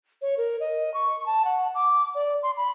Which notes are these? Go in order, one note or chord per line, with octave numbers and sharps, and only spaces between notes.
C#5
A#4
D#5
C#6
A5
F#5
D6
D5
C6
B5